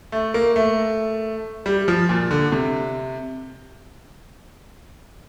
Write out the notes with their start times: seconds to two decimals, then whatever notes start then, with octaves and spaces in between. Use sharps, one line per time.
0.12 A3
0.34 A#3
0.56 A3
1.66 G3
1.88 F3
2.09 A#2
2.31 D3
2.52 C3